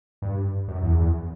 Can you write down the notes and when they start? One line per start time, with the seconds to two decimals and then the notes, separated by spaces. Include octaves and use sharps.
0.22 G2
0.68 F#2
0.83 E2
0.98 E2